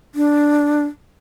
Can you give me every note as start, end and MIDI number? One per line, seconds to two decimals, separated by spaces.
0.15 0.84 62